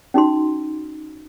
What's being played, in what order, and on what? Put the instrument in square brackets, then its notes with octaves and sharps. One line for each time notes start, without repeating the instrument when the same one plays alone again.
[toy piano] C#4 D#4 F#4 C6